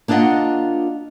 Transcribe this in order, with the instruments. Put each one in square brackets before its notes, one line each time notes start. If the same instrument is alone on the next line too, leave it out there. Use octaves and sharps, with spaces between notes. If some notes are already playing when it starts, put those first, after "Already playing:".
[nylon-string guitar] A#3 D4 F4 D#5 F#5